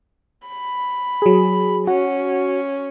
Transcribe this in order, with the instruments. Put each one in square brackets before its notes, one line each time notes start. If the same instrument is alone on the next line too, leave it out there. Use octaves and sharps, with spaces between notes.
[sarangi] B5
[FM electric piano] F#3 G#4
[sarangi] C#4 [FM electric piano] F#4